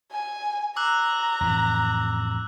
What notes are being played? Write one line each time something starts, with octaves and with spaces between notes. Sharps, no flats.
G#5
A#5 D6 E6 F#6
F2 A2 E3